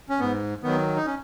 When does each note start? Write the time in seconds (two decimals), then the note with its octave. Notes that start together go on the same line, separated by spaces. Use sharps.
0.09 C#4
0.20 G#2 B3
0.63 D#3 F#3 B3
0.96 D#4
1.06 C#4